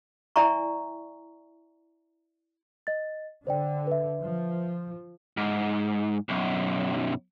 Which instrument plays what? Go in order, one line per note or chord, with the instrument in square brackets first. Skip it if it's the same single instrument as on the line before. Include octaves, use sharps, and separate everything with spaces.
[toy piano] E4 D5 E5 G#5 A#5 C#6
[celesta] D#5 A6
[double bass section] D3 [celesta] C5 D5 G5
[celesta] B4 E5
[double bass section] F3
[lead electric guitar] G#2
B1 F#2